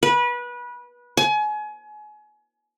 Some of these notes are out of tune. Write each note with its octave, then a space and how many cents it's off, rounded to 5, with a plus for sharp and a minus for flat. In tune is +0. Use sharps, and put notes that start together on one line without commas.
B4 -25
G#5 +30